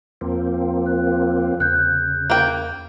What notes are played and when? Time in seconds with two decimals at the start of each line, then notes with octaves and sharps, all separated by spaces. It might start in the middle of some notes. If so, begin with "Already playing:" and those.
0.21 E2 F3 A#3 C4
0.86 F#6
1.60 E2 C#3 F#6 G6
2.30 A#3 G5